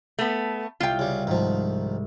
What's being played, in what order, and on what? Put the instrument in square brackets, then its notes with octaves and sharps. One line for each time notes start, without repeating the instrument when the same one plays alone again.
[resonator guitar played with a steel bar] A3 B3
[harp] C2 [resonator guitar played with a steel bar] F4 G5
[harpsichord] C#3 G3
[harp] G#2 [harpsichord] D#3 F3